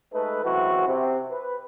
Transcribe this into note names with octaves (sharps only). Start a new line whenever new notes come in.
G#3 A3 D#4 A4 B4
F#2 E3 G#3 C4 E4 F#4
C3 C4
B4